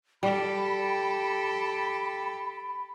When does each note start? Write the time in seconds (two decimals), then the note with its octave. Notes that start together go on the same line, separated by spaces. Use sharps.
0.23 G3 G4 A4 B5